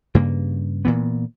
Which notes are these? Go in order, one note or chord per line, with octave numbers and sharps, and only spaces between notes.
G2 C#3 A#3
A#2 E3 B3